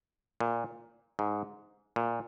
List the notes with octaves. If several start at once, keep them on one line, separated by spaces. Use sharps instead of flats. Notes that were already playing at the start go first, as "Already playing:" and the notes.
A#2
G#2
A#2